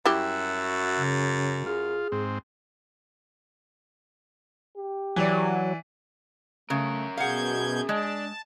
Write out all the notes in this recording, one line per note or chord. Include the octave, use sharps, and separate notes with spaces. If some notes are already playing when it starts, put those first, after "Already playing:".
F#2 G3 E4 F#4 G4 E5
C#3
F4 G#4
G#2 C4
G4
E3 F#3 D5
C#3 A3 C#4 A#4
B2 G#4 F5 F#5 G6 G#6
G#3 D4 A5